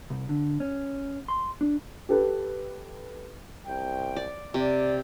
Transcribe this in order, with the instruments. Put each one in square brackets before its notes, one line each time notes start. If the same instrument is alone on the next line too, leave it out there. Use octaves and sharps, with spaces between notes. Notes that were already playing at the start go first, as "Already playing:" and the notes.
[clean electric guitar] C2
D3
C#4
C6
D4
[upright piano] G4 A4 B4
[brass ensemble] C2 G5
[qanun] D5
[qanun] C3 [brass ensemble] D5